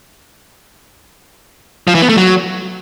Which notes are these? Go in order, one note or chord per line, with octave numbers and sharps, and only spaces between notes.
F3
E3
B3
A3
F#3